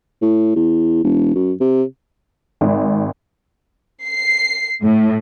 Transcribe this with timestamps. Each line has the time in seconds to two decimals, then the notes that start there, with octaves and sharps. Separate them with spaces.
0.22 A2
0.56 E2
1.04 E1
1.35 F#2
1.60 C3
2.61 G#1
4.06 C7
4.83 A2